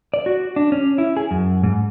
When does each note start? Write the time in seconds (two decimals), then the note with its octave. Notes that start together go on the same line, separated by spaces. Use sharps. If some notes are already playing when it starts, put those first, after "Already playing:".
0.14 D5
0.26 F#4
0.56 D4
0.72 C#4
0.98 E4
1.17 G#4
1.31 F#2
1.64 G#2